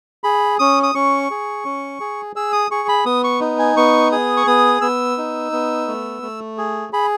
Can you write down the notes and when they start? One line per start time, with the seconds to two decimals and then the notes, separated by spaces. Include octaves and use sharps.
0.24 G#4 B5
0.59 C#4 D#6
0.83 D#6
0.95 C#4 C#6
1.30 G#4
1.65 C#4
2.00 G#4
2.36 G#4 E6
2.52 D#6
2.71 G#4 C#6
2.89 B5
3.05 B3 D#6
3.24 C#6
3.41 D#4
3.59 G#5
3.77 B3 C#6
4.12 G#4 D#6
4.37 C#6
4.47 B3 D#6
4.81 B3 E6
5.18 D#4
5.52 B3
5.88 A3
6.22 A3
6.58 G#4
6.93 G#4 B5